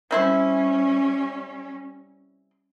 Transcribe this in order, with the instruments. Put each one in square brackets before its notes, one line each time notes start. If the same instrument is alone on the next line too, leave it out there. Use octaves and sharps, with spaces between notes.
[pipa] C3 E4 C5 [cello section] G3 C#4